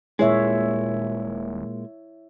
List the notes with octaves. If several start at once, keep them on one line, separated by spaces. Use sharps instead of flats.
D#1 A#2 G#3 E4 C#5 E5